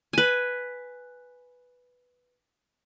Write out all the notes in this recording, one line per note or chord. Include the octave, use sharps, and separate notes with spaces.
B4 G#5